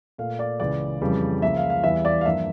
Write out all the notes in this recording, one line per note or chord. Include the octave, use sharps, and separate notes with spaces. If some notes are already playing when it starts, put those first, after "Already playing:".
A#2 A3 F5
D5
C#2 C#3 E3 D5
F2 C#3 E3 G3
C#2 C#3 F3 A#3 E5
F5
F5
E2 E3 G3 E5
D5
F5
G2 F3 A#3 E5